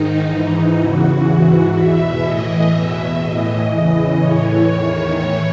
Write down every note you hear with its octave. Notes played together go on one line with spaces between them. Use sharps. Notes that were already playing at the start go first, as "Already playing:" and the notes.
Already playing: G#2 D#3 D#4
G#2 E3
E2 C#3 E3 F#4
G#2 E3
E2 B2 E5
A2 E3 D#5
E2 B2 E5
A2 E3 D#5
E2 C#3 E3
A2 E3 C#5
E2 D#3
A2 E3